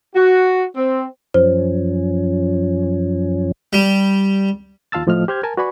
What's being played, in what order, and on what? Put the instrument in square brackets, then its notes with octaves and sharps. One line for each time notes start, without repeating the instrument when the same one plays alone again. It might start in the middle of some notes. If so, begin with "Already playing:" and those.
[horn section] F#4
C4
[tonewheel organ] F#2 F3 C#4 [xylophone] C5
[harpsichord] G3
[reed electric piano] D#2 F4 F5 A5 E6 A6
A2 F3 A3 D#5 F6
G4 C5 F6 G6 G#6
A#4 G#5 A5
F#4 B4 D5 G#5 B5 C#6